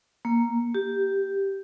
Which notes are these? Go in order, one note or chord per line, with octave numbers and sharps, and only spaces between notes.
A#3
G4